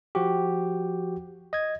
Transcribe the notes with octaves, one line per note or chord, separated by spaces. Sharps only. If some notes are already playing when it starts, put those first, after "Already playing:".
F3 F#4 G4
D#5 G#6